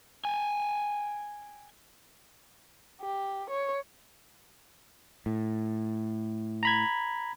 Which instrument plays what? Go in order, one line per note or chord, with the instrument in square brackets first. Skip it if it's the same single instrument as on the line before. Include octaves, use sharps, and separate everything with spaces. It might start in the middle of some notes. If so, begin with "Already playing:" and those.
[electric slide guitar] G5 G#5
[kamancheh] G4
C#5
[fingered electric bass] A2
[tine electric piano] A#5 B5 G#6